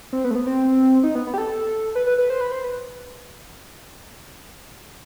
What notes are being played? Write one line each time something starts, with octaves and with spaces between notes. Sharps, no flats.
C4
B3
A3
B3
C4
D#4
B3
B3
G4
A4
B4
B4
B4
C5
B4
C5
B4